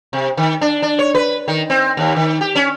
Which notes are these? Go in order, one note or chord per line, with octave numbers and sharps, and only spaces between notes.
C3
D#3
D4
D4
C#5
B4
D#3
C4
D#2
D#3
G4
C#4